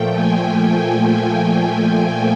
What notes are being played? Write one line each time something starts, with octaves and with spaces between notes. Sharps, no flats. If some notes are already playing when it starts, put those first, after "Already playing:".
Already playing: A#2 F3 A3 G5
G#5
G#5